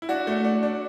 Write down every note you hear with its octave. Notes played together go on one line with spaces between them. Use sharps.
E4
D4 F#4
A3
D4
D4